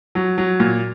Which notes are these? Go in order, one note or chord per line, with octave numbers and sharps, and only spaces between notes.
F#3
F#3
A#2